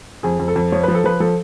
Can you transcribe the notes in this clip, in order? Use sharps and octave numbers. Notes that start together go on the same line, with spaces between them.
F2 G#4
F2
A4
F2
F3 C#5
F3 B4
A4
F3 B4
F3 A4